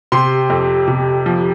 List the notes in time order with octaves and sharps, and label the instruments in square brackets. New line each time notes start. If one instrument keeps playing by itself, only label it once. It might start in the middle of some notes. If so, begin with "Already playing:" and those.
[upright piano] C3 C6
F2
C3
F3